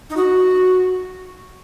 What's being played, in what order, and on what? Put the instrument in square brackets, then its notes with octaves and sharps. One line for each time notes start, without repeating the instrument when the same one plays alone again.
[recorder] D#4
F#4